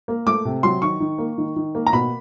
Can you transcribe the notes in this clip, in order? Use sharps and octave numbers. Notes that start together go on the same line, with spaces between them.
A#3
A3 D6
C3
F#3 C6
D#3 C#6
D#3
A#3
D#3
D#3
A#3
A#5
B2 B5